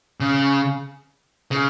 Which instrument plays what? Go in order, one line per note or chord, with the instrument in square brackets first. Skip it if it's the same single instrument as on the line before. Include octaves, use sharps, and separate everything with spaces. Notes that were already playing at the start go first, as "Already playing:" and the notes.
[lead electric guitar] C#3
C#3